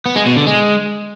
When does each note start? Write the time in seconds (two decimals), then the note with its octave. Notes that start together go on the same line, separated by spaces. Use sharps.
0.06 B3
0.16 G#3
0.26 B2
0.36 D3
0.46 G#3